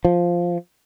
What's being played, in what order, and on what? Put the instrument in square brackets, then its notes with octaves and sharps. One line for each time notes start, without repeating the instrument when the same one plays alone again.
[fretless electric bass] F3